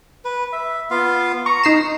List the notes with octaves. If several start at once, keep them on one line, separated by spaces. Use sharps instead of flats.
B4
E5
B3 F4 F5
A#5 C#6
D#4 C7 E7